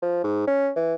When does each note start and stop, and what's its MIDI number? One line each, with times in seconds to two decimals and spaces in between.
0.02 0.22 53
0.24 0.44 44
0.47 0.70 61
0.76 0.94 52